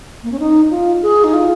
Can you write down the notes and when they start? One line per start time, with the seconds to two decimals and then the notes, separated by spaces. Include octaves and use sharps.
0.23 A#3
0.32 C#4
0.40 D#4
0.70 F4
1.02 G#4
1.24 D#4
1.34 F4